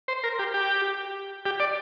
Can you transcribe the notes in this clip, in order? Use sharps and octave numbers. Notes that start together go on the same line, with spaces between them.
C5
A#4
G4
G4
G4
D5